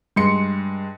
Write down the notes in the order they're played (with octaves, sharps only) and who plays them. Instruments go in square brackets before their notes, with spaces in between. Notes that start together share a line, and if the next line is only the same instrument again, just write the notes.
[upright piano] G2 G#3 C6 C#7